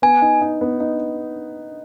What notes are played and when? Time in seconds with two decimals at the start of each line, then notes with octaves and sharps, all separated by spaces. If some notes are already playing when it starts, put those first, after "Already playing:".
0.02 B3 G#5
0.22 D#4
0.41 D#4
0.61 B3
0.80 D#4